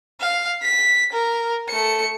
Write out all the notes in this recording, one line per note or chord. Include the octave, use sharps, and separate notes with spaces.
F5
B6
A#4
A3 C#7